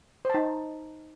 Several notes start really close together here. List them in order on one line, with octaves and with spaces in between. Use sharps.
C5 A5 D#4